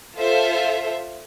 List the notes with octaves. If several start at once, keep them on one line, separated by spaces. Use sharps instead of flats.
F4 A4 C5 E5